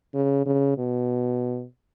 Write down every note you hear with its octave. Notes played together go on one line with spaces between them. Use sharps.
C#3
C#3
B2